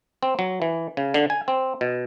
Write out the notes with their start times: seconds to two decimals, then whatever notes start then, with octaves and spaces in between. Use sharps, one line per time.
0.23 C4
0.39 F#3
0.62 E3
0.97 C#3
1.14 D3
1.30 G#5
1.48 C4
1.81 B2